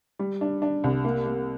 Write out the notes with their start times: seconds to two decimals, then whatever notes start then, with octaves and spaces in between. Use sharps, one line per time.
0.19 G3
0.41 D4
0.62 D4
0.84 C2
1.05 A#3
1.26 A#3